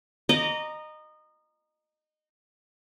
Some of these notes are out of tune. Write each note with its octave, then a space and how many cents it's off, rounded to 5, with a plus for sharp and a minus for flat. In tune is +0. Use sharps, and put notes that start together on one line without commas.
D#5 -20 A#5 +0 D6 -30